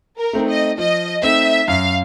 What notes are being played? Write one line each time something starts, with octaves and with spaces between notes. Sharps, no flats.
A#4
A3 C4 D#4
D#5
F3 D#5
A3 C4 D#4 E5
F#2 F5